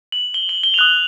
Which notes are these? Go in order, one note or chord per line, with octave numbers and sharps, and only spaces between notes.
F#7
G7
F#7
G7
F7
D#6 F#6 F#7